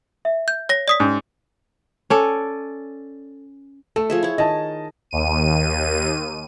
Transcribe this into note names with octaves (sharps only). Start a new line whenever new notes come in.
E5
G6
C#5 A#6
D5 D#6 B6
G#2 C#4 F#4
C#4 A4 D5
A3 A4
F3 G#4 E5
E4 C#5
D#3 D#5 A5
D#2 D#7